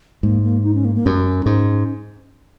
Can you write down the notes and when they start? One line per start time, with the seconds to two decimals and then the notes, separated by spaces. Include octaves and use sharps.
0.23 G#2 A#3
0.43 A#3
0.64 D#4
0.75 C#4
0.85 A#3
0.95 A#3
1.06 F#2 C#4
1.46 G#2